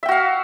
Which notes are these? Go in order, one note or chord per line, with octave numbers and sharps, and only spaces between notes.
F#4 E5 F5 G5